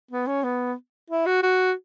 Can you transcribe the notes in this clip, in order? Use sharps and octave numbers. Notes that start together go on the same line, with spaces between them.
B3
C#4
B3
E4
F#4
F#4